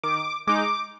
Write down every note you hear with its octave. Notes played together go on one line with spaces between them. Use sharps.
D#3 D6
G#3 D#4 D6